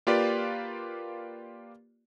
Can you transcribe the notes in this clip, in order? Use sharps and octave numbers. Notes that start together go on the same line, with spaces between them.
A#3 F4 G4 B4 D5